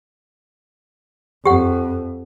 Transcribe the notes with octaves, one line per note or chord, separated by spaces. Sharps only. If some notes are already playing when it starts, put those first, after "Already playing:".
F2 G4 F#5